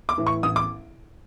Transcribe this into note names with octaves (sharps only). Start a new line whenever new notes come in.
D6
A2 E3
C#6
A1 D#6
D6